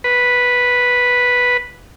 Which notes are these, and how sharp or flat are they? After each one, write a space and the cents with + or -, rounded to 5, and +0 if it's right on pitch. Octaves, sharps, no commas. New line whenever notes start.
B4 -5